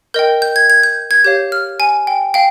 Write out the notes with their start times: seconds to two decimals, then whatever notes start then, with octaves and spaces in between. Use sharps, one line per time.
0.14 A#4 D#5 G5 G6
0.42 G6
0.56 G#6
0.70 G#6
0.83 G6
1.11 G#6
1.24 G4 C#5 F5 G6
1.52 F6
1.80 G#5
2.07 G5
2.34 F5 G5